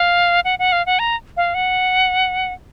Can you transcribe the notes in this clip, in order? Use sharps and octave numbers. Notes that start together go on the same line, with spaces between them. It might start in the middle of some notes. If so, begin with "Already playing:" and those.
Already playing: F5
F#5
F#5
F5
F#5
A#5
F5
F#5